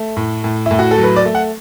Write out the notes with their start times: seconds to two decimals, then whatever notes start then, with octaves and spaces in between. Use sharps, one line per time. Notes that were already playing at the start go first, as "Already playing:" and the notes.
Already playing: A3
0.17 A2
0.44 A2
0.66 A2 E4
0.79 F#4
0.91 A4
0.98 F#3
1.03 B4
1.16 D5
1.25 A3
1.35 F#5